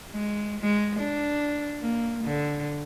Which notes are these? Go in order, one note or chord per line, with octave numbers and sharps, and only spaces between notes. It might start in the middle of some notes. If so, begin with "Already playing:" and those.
G#3
G#3
D4
A#3
D3